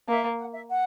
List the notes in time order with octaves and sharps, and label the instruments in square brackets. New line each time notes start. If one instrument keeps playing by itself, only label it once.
[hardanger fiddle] A#3 [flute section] E5
[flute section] F#5
E5
F#5